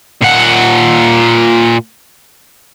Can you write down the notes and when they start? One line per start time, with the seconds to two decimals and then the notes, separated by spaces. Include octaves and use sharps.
0.22 A#2 F#5